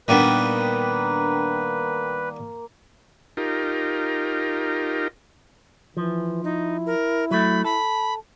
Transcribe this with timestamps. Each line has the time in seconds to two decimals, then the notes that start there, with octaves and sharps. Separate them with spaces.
0.08 A#2 D#3 G3 A#3 B3 D4 B4
3.37 D#4 F4 G4 A#4
5.97 E3 F3
6.44 D#4 E4
6.86 A#4
7.31 F#3 A3 B5
7.64 A4 B5